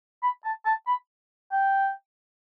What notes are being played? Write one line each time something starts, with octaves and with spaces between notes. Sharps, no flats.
B5
A5
A5
B5
G5